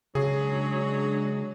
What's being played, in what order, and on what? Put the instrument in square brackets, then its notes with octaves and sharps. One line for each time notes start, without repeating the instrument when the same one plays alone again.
[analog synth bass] C#3 [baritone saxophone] F#3 [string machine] G#3 D4 [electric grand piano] G#4